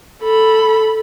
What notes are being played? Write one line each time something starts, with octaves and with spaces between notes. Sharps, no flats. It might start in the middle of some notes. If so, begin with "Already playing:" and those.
A4 B5